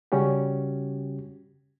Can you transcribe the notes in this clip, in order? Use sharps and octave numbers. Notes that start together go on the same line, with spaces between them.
C#3 G3 C#4 F#4 G4